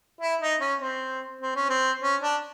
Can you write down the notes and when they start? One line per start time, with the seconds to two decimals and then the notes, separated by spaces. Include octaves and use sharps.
0.21 E4
0.41 D#4
0.60 C#4
0.80 C4
1.41 C4
1.55 C#4
1.69 C4
2.02 C#4
2.22 D4